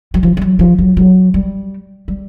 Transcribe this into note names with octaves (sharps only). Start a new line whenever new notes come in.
F#3
F3
G3
F#3
F3
F#3
F#3
G3
G3